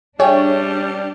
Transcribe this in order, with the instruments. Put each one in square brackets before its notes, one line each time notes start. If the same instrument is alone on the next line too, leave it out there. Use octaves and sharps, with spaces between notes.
[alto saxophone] G3 [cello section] D4 [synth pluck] G#4 C#5 [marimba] E5 G5 G#5